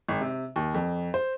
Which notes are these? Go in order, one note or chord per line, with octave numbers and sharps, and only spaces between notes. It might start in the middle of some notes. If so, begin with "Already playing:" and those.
G#1
C3
D#2
F2
C5